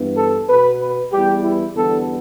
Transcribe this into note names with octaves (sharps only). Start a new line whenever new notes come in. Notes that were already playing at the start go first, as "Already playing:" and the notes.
Already playing: G2 E3 B3
A4
B2 B3 B4
B4
E2 E3 G3 G4
E4
E2 D3 G3 B3 A4